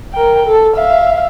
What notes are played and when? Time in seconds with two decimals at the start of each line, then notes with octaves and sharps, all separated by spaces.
0.13 A#4 G5
0.46 A4
0.76 E5 F5